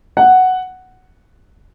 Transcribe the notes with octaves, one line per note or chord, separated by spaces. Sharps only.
F#5